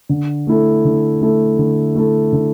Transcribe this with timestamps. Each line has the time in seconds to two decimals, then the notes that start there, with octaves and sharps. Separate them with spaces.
0.09 D3
0.47 A3 E4 A4
0.85 D3
1.21 A3 E4 A4
1.59 D3
1.95 A3 E4 A4
2.33 D3